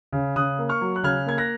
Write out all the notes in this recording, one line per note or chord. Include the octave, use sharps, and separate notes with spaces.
C#3
C#3 D#6 F#6
A#3
C#6 F6
F#3
F#6
C#3 F6 G#6
A#3 G#6
F#6 A#6